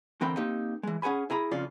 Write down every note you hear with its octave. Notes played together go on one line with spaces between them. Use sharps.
D3 E3 C4 A#4 G5 B5
A#3 C4 D#4 G4
E3 G#3
C#4 G#4 F#5 G#5 B5
E4 G#4 A#5 B5
F2 C#3 C#4 F4 D5